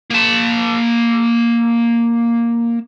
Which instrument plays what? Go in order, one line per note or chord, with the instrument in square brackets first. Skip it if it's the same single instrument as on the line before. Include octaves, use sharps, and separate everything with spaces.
[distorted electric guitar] A#3 A5